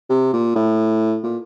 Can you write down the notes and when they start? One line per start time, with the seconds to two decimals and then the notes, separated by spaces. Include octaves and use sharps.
0.10 C3
0.33 A#2
0.55 A2
1.24 A#2